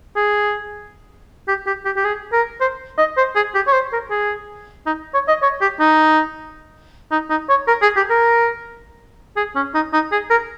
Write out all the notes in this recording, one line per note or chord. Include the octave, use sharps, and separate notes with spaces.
G#4
G4
G4
G4
G4
G#4
A#4
C5
D#5
C5
G#4
G4
C#5
C5
A#4
G#4
D#4
C#5
D#5
C#5
G4
D#4
D#4
D#4
C#5
A#4
G#4
G4
A#4
G#4
C#4
D#4
D#4
G#4
A#4